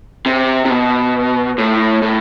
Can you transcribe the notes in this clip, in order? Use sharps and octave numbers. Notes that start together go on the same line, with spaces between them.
C3
C3
B2
A2
A2